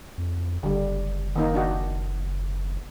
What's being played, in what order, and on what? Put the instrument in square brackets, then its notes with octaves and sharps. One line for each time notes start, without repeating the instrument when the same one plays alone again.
[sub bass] F2
[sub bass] F#1 [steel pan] D3 G3
[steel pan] D#3 A#3 D#4
D4 D#4 F#4